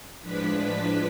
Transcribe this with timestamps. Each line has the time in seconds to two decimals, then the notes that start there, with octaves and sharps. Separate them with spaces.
0.22 A2 F3 G#3 D4 B4 B5